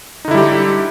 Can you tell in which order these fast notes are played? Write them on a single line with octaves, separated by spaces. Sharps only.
D#4 D3 E4 G3 G4